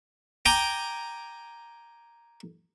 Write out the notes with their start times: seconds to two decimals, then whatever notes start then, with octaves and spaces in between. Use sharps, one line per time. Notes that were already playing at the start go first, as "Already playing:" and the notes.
0.46 G5 G#5 A#5 D6